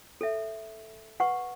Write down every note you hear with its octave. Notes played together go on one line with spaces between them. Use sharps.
A4 C#5 E5
B4 F#5 C#6